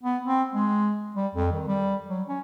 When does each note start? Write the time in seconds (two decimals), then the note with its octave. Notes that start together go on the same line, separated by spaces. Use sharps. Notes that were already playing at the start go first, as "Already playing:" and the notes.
0.03 B3
0.25 C4
0.54 G#3
1.16 G3
1.35 F2
1.52 D#3
1.67 G3
2.08 F#3
2.28 C#4